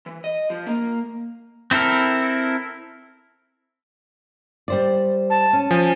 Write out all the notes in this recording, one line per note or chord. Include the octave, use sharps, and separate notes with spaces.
E3
D#5
F3
A#3
C4 E4 A4 A#4
G3 C5 D5
A5
C#4
F3 G#5